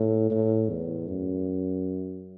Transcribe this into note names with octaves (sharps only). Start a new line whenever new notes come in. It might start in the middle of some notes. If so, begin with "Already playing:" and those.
Already playing: A2
A2
E2
F#2